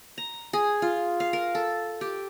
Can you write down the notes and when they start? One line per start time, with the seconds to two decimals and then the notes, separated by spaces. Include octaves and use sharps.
0.18 A#5
0.53 G#4
0.82 F4
1.20 F5
1.33 A#4
1.55 A4
2.01 G4